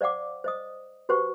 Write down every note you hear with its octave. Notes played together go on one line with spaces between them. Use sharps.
C5 D5 F5 F#5 D6
C5 D#5 D#6
F#4 G4 B4 C5 F#5 C#6